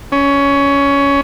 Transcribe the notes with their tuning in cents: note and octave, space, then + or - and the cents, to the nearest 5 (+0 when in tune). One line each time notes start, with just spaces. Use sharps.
C#4 +15